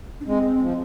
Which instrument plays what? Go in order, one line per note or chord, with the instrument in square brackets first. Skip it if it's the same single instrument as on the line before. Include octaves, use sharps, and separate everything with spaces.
[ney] D4
[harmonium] G#3 [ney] C4
[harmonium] F3